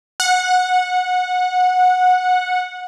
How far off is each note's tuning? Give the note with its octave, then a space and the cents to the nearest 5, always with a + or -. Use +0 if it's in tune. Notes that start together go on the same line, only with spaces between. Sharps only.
F#5 -15